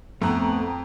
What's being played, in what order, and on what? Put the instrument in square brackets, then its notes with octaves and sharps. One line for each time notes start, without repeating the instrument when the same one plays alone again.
[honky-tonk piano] F2 A#5 [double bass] A2 C4 [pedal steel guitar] A3 B3 F#5